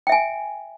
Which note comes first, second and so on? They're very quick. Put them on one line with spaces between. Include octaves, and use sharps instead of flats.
G5 E5 G#5